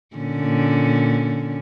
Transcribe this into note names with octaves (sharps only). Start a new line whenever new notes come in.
A#2 D3 C#4